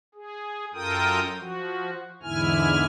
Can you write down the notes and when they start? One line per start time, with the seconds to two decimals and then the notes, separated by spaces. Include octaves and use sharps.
0.15 G#4
0.74 F#2 F4 A4 A#4 G5 D#6
1.38 F3 F#4
2.23 E2 G#2 D3 E4 G#5 F6